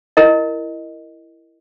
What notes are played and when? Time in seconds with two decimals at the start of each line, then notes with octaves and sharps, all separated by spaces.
0.17 E4 A#4 D#5